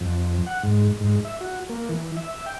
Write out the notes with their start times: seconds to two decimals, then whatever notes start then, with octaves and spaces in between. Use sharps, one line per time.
0.01 F2
0.46 F#5
0.63 G#2
1.00 G#2
1.25 E5
1.41 F#4
1.69 A#3
1.89 E3
2.17 E5
2.46 G5